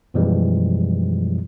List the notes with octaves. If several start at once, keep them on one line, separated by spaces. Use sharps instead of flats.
F#2 B2 E3 F3 G3 G#3